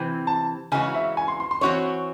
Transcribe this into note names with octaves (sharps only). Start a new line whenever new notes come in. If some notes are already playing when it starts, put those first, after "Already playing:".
Already playing: C3 E3 C4
A5
C#3 E3 G#3 C#4 F#4 G#5
E5
G#5
C6
C6
C6
E3 C4 D#4 F#4 C#5 C#6